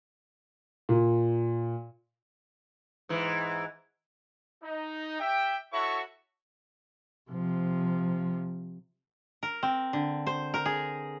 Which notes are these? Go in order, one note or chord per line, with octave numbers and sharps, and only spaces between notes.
A#2
G#2 E3
D#4
G4 E5 G5
E4 F#4 A4 C#5 E5 C#6
C3 F3
A#4
C4
D3
C5
A#4
G#4